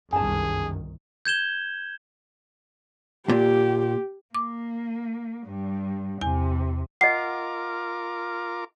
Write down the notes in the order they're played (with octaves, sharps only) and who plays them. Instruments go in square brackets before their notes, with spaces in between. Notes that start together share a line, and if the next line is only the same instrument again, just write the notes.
[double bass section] G1 C2 D#3 [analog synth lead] F#2 [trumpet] G#4 [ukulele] G#5 A5
[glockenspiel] G6 G#6 E7 G7
[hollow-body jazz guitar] A#2 [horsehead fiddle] G4
[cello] A#3 [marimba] D6
[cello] G2 G3
[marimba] E2 G#5 [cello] C3
[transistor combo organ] F4 A#4 D6 [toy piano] D#5 F#5 [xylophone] C7